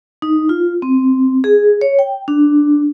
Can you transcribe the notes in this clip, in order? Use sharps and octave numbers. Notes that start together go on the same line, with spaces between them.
D#4
F4
C4
G#4
C#5
G5
D4